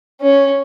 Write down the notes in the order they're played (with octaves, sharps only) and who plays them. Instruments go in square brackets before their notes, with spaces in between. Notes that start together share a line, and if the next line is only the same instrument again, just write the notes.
[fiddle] C#4